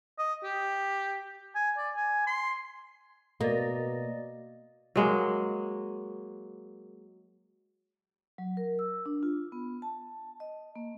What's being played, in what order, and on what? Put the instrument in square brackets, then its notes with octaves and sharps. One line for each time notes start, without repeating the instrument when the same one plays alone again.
[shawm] D#5
G4
G#5
D5
G#5
C6
[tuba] B2 [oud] A#3 [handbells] D5 D#5
[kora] F#3 G#3 A#3
[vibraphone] F#3
A#4
E6
D4
F4
B3
A5
D#5
A#3